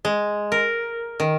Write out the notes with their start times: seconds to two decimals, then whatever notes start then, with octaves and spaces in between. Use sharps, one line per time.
0.05 G#3
0.52 A#4
1.20 D#3